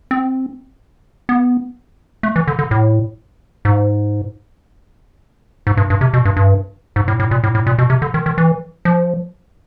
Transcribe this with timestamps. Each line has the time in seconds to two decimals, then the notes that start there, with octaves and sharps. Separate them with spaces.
0.11 C4
1.29 B3
2.23 A3
2.36 E3
2.48 D3
2.59 D3
2.71 A2
3.65 G#2
5.67 G#2
5.77 G2
5.90 G2
6.01 C3
6.13 B2
6.25 G2
6.37 G2
6.96 G#2
7.08 A2
7.20 A2
7.31 A#2
7.44 A2
7.55 A2
7.67 A#2
7.78 B2
7.90 C3
8.02 D3
8.14 D#3
8.26 D#3
8.38 E3
8.85 F3